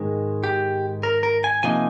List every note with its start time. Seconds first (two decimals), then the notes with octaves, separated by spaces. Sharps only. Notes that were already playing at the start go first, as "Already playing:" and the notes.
Already playing: G#2 D#3 G#3
0.44 G4
1.03 A#4
1.23 A#4
1.44 G#5
1.63 C3 F3 A#3 D#4 G#5